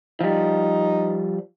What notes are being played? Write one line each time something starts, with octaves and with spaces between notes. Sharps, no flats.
F3 G3 D#4